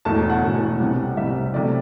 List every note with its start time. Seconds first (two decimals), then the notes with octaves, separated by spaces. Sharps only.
0.05 E1 E2 B2 A3 A5
0.30 F#5
0.42 E1 E2 B2 A3
0.80 C2 C3 G3
1.17 C2 C3 G3 E5
1.54 C3 F#3 A3 D5